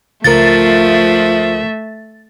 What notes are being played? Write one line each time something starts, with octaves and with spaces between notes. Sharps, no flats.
C#2 F3 A3 A#4 E5 A6